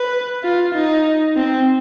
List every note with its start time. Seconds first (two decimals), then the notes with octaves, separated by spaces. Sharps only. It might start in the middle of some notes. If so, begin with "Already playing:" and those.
Already playing: B4
0.44 F4
0.74 D#4
1.36 C4